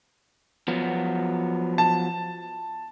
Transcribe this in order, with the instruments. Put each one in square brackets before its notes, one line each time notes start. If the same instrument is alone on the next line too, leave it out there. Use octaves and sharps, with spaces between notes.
[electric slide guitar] F3 F#3 B3
[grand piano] A5